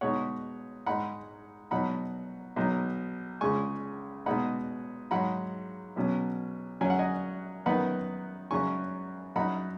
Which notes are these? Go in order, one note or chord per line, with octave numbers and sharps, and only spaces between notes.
B2 G#3 D#4 C#5 F#5
G#2 G#3 D#4 F#5 B5
B2 F#3 D#4 F#5 B5
B1 B2 F#3 D#4
C#2 C#3 G#3 G#5 C#6
B2 G#3 D#4 F#5 B5
G#2 F#3 D#4 F#5 B5
B1 B2 F#3 C#4
F#2 F#3 C#4 G#5
F#5
D#5 G#5
F#2 D#3 B3 D#4 F#5 B5
F#2 C#3 F#3 G#5 C#6
F#2 F#3 D#4 F#5 B5